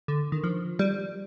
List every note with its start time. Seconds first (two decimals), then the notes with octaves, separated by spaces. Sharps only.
0.08 D3
0.32 D#3
0.44 F3
0.79 G3